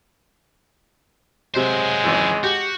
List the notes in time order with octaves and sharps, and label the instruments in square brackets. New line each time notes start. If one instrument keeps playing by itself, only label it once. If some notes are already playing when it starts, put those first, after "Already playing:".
[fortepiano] C3 C4 [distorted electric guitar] F#3 C5 [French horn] G#3
[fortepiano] G#1 C#2 E3
[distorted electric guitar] F#4 [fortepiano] G4